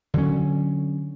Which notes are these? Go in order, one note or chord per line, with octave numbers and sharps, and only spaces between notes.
D3 F#3 C#4